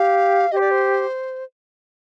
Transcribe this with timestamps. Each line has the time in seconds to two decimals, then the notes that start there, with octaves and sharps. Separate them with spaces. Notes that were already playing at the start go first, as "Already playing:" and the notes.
Already playing: G4 F5
0.52 G4 C5 D#5
0.61 D5
0.71 C5